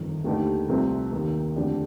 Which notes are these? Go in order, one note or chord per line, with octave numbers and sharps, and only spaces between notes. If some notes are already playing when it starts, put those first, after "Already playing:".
Already playing: G1 F2 D#3
D#2 D3 A3 D#4 G4
C2 C3 F3 A3 C4
D#2 D#3 A#3
F2 D3 A3 D4 G4